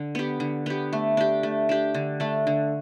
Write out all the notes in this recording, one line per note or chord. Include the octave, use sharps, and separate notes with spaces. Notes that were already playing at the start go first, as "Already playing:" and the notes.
Already playing: D3
B3 G4
D3
B3 G4
A3
D4 G4
A3
D4 G4
D3
A3 D4 A4
D3